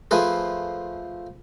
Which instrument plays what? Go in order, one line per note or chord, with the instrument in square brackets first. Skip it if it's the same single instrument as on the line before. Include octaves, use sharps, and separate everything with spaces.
[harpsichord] F3 A3 G#4 B4 C5